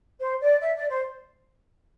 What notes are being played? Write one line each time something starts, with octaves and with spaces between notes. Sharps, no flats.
C5
D5
E5
D5
C5